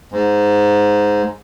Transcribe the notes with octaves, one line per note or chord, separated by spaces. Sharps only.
G#2